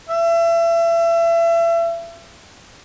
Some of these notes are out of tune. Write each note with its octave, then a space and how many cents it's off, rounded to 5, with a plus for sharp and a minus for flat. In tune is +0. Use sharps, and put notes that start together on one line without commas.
E5 +30